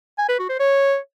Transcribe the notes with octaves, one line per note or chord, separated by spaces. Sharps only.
G#5
B4
F#4
C5
C#5